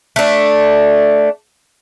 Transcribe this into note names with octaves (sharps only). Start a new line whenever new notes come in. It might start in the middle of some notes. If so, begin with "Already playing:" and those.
A3 D4